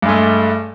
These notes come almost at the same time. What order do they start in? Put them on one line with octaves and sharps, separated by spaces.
G2 G#3 A3